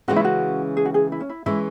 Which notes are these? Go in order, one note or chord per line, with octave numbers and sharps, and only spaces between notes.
C#3 E3 G#3 C#4 F#4
E4
F#4
G#4
F#4
G#4
E4
C#4
E4
E3 G#3 C#4 E4